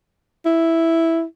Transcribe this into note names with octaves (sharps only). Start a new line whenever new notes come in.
E4